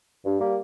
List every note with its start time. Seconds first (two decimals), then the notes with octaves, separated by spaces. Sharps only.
0.25 G2
0.40 G3 A#3